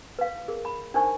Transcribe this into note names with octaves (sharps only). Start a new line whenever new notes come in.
B4 F5
G#4 A#4
B5
D4 D#4 A#4 C5 G#5 C#6